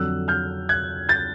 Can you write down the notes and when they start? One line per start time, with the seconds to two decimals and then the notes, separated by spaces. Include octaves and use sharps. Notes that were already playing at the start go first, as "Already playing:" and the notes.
Already playing: F2 D3 F#3 E6 F#6
0.28 F6 G6
0.69 F#6 G#6
1.09 G6 A6